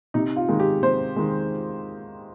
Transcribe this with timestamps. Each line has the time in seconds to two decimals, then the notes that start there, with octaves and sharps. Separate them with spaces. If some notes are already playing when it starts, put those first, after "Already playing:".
0.14 C3 D#4
0.37 F4
0.49 D#3 G#3
0.60 G4
0.82 C3 C5
1.16 D#3 G#3